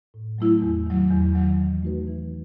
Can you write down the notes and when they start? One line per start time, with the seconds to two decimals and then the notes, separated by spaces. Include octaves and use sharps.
0.14 A2
0.38 F#3 A3 E4
0.62 E2
0.86 D#3 F#3
1.11 E2
1.35 D#3 F#3
1.59 E3
1.83 A3 D#4 F#4 B4
2.08 E3